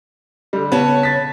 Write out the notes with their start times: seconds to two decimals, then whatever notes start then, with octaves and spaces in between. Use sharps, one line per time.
0.53 D3 G3
0.72 C#3 B3 C#5 A5
1.03 A6 B6